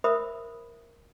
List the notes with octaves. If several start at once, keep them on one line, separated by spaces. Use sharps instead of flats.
A#4 C5 E5 B5 D#6